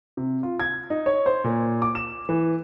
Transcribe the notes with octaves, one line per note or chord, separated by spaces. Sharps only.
C3
F4
G#6
D#4
C#5
C5
A#2
D6
E7
E3